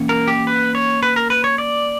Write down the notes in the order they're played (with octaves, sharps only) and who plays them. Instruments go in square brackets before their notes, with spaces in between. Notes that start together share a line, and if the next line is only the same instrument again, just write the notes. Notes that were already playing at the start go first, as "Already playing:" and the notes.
Already playing: [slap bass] E3 A#3 C#4
[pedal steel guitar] A#4
G4
B4
C#5
B4
A#4
B4
C#5
D5